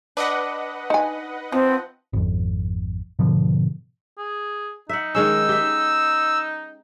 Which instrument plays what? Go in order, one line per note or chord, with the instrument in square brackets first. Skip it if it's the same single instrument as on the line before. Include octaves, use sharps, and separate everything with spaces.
[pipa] D4 [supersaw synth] B4 D#5 F#5
[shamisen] D#4 G#5
[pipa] F3 [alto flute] C4
[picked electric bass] G#1 F2
G#2 B2 D3 F3
[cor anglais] G#4
[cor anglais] D#4 [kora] E5 F#5
[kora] D#3 G#3 C#4 [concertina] E6
[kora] G4 E5